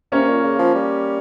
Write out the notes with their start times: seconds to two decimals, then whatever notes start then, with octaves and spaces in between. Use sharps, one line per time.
0.12 C3 A#3 C#4
0.28 A#2
0.44 C#3
0.59 F3
0.75 G3